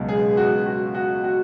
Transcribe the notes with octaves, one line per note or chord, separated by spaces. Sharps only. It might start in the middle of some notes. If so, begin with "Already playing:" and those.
Already playing: C#2 B2 F#3
G#4
F#4
F#4
F#4
F#4